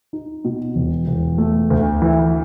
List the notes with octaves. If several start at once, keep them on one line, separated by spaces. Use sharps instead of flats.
D#4
B2
E1
E1
A3
D2
E3